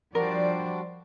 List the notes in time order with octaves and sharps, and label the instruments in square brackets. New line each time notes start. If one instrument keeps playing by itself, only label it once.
[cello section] F3 C5 D5 [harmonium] G3 D4 F#4 [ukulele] A#4